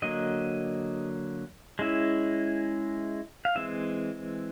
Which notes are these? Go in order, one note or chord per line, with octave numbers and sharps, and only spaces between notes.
D3 F#3 A#3 D#5
G#3 C#4 E4
F5
E3 G#3 C4 E5